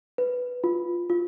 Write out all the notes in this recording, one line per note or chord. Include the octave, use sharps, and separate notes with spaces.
B4
F4
F4